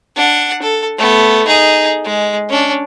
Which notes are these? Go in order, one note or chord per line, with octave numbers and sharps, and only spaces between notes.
D4 F#5
A4
A3 B3
D#4 G#4
G#3
C#4 D4